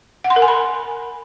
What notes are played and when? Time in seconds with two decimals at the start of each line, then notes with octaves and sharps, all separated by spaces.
0.24 F#5
0.30 C6
0.36 A#4
0.42 G#5
0.48 B5